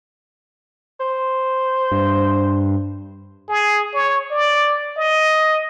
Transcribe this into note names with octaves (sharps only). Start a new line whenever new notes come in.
C5
G2
G#4
C#5
D5
D#5